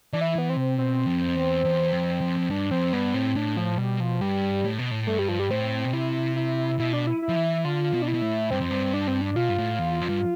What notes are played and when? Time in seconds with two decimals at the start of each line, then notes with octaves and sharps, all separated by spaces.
0.13 E3 D4
0.21 E4
0.36 E3 B3
0.49 C4
0.56 C3
0.78 B2 C4
1.07 F2
1.36 E2
1.65 E2
1.93 F2
2.21 F2
2.38 F2
2.50 G2 D4
2.71 F2 C4
2.93 G2 B3
3.14 A2 C4
3.35 A2 D4
3.57 F3
3.78 B2 G3
4.00 F3
4.21 G2 G3
4.65 A2
4.79 B2
4.91 A2
5.07 G2 A3
5.19 G3
5.29 F3
5.39 G3
5.50 A2 C4
5.85 B2
5.93 C3 E4
6.36 E4
6.79 B2 E4
6.93 D4
7.07 E4
7.22 E4
7.29 F3
7.36 E3
7.64 D3 F4
7.94 B2
8.02 D4
8.08 E4
8.14 B2
8.22 A2
8.51 G2 C4
8.60 F2
8.71 G2
8.94 D4
9.08 C4
9.21 D4
9.36 B2 F4
9.49 G2
9.58 A2
9.79 E2
10.01 F2
10.09 G2